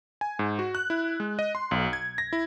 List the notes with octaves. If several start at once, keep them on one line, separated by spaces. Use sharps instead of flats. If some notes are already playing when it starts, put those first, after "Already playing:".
G#5
G#2
F#4
F#6
E4
G#3
D#5
C6
B1
G#6
A#6
E4